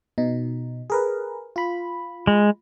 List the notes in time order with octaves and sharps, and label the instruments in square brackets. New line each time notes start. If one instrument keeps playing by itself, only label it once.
[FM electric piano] B2 D#4
G#4 A#4 B4
F4 B5
[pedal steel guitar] G#3